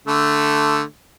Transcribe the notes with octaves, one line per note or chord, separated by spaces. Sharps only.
D3 A3